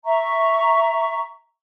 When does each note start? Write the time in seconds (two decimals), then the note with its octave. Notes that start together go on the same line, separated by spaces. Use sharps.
0.05 E5 A#5 C#6